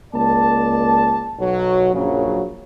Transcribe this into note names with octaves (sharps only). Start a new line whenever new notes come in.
C#2 A#3 D5 A5
B1 F#3
A#1 F#2 C#3 F#3